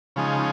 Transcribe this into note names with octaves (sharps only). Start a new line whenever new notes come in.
C#3 F3 G#3 D#4